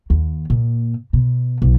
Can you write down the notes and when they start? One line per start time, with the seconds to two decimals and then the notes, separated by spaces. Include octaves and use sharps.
0.10 D#2
0.50 A#2
1.13 B2
1.62 B1